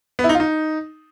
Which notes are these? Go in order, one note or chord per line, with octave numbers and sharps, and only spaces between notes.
B3
E4
D#4
F4
D#4